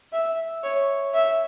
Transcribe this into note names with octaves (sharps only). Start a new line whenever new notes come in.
E5
C#5
E5